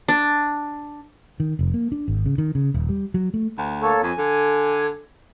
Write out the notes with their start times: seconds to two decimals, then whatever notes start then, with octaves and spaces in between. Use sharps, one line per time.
0.08 D4
1.40 D#3
1.59 F1
1.74 A#3
1.92 D4
2.08 G#1
2.26 C#3
2.38 D#3
2.55 C#3
2.74 D#1
2.89 G3
3.14 F#3
3.34 A3
3.58 D2
3.82 A#3 A4 C#5
4.03 F2 G#5
4.18 D3